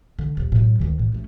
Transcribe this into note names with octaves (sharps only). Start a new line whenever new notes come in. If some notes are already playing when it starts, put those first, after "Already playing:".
D3
D#1
A2 F#3
D2 D#3
A2
A3 C#4